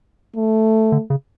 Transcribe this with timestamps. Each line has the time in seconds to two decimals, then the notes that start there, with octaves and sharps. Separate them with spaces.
0.36 A3
0.92 D3
1.10 C#3